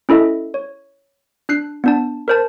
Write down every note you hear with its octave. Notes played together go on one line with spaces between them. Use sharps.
C#4 E4 A4 D#5 E5
C#5
D4 F#6 C7
B3 D4 A5
A#4 C5 A5